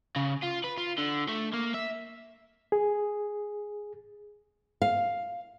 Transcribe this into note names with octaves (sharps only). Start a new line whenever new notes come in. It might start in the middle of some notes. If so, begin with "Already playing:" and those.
C#3
F4
B4
F4
D3
A3
A#3
E5
G#4
F5